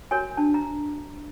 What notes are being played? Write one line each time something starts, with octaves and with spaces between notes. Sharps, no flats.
F#4 A#4 C#5 G#5
D4 A5
A#5